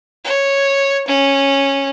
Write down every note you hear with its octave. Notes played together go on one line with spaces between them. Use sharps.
C#5
C#4